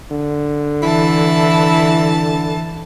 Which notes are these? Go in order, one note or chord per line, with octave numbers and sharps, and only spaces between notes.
D3
E3 E4 A5